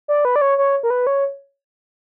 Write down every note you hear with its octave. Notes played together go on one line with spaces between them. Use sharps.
D5
B4
D5
C#5
C#5
A#4
B4
C#5